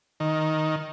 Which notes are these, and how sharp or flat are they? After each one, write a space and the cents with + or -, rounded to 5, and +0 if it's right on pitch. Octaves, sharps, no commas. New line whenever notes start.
D#3 +5